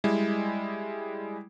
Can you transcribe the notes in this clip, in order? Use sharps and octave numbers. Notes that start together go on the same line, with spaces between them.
G3 G#3 E4